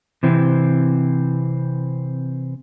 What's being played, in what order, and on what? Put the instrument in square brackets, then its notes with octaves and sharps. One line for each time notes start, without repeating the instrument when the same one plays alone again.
[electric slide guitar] C3 E3 C4